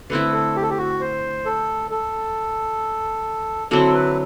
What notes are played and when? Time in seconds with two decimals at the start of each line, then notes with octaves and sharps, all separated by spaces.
0.10 D3 A3 C4 E4 B4
0.33 A4
0.56 G4
0.62 A4
0.70 G4
0.78 F#4
1.01 C5
1.45 A4
1.91 A4
3.71 D3 F#3 C4 E4 A4
3.94 B4